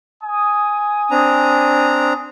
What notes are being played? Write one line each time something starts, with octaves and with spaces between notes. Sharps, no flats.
G#5 D#6
C4 D4 A#5